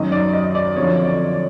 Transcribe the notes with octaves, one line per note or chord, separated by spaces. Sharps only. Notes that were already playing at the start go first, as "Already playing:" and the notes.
Already playing: F#2 D#3 F#3 D#5
D5
D#5
D5
F2 D3 F3 C#5
D5
D5